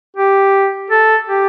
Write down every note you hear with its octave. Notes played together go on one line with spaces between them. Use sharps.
G4
A4
G4